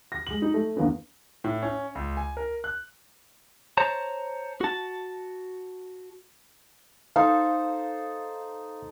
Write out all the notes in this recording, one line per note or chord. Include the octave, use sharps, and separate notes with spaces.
A#6
G#3 F#7
D#4
A3
E2 D3 A#3 B3 C#4
A2
C#4
C#2
G#5
A#4
F#6
C5 C#5 A5 A#5
F#4 A5
D#4 A4 C5 F5